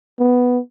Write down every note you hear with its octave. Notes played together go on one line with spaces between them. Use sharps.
B3